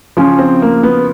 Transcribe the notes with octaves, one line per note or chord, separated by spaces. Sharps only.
C#3 F3 C#4
C4
A#3
B3